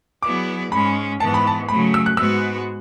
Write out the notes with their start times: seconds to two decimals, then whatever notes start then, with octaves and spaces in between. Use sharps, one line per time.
0.22 F#3 B3 E4 G#4 D5 D6
0.72 G#2 G#3 C#4 B5
1.20 G#2 E3 B3 A5
1.34 B5
1.47 A5
1.69 C#3 F#3 A3 B5
1.94 E6
2.06 F#6
2.17 G#2 G#3 B3 F#4 B4 E6